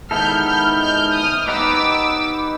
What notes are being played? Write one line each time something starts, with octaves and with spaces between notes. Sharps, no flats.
D#3 G#3 B3 E4 A4 F6 G6
F6 G6
F6 G6
D#6 F6
B3 D#4 G4 B4 D6 E6